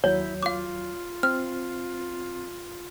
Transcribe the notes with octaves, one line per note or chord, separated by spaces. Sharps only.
D#2 F#3 E4 C#5 G6
F4 F5 D6
C4 F6